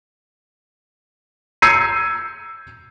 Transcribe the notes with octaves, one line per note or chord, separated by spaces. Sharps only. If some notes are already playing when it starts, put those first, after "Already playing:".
E6 G6 G#6 C7 C#7 D#7